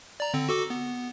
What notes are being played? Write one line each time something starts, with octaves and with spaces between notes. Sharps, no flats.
D5 A#5
D3 C4
F#4 A4 D6
B3